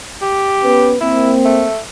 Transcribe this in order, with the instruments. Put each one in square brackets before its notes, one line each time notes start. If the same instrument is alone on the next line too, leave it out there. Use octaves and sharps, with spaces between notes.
[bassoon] G4
[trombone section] B3 C#4 B4
[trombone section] A#3 C4 [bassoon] E4
[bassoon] A3